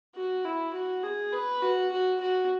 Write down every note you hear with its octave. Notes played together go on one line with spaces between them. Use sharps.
F#4
E4
F#4
G#4
B4
F#4
F#4
F#4